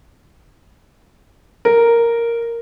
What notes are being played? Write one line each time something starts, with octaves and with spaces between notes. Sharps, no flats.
A#4